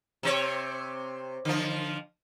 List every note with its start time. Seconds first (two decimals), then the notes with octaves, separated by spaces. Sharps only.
0.23 C3 C4 C#5
1.45 D3 F3